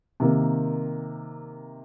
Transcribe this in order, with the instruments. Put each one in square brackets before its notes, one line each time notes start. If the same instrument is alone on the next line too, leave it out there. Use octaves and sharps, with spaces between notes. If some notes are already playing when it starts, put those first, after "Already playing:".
[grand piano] C3 D#3 A#3